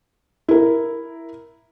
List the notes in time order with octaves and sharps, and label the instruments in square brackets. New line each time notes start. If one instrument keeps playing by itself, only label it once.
[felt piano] E4 A#4